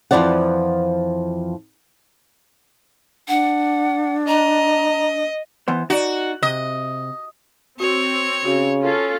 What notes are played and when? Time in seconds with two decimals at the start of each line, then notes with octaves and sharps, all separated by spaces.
0.11 F2 C#3 E3 F3 D5 F#5
3.28 D4 F#5
4.28 D#5 A#5
5.68 E3 B3 C5
5.90 D#4 F#4 D5
6.43 C3 D#5
7.80 C4 F#4 C#5
8.45 C#3 F#4
8.82 C#4 F4 A4